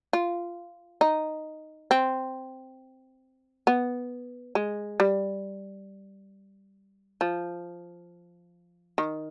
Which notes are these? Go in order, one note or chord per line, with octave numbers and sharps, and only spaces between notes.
F4
D#4
C4
B3
G#3
G3
F3
D#3